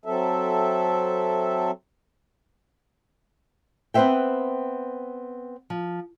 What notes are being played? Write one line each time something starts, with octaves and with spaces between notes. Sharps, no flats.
F#3 C4 A4 E5
B3 C4 B4 C5 E5 G5
F3